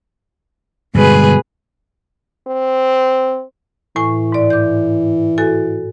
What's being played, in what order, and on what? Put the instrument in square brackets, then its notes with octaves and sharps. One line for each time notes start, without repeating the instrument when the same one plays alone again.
[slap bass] G2 D3 G#3 [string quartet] B2 G#4 B4
[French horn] C4
[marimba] A2 G#5 C#6 [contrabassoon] E3
[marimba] G#2 D5
D6 G6
F#4 A4 G#5